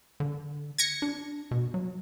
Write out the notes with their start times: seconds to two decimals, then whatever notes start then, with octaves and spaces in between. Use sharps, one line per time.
0.20 D3
0.78 G#6 A#6 C#7
1.02 D4
1.51 B2
1.74 F#3